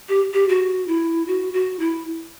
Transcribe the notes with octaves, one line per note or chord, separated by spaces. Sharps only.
G4
G4
F#4
E4
F#4
F#4
E4